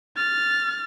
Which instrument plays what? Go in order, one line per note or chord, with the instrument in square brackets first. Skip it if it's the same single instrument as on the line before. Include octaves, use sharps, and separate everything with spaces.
[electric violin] F6 A6